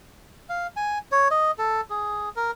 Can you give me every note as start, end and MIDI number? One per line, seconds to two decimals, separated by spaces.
0.49 0.67 77
0.76 0.98 80
1.12 1.28 73
1.31 1.51 75
1.58 1.81 69
1.90 2.29 68
2.36 2.51 70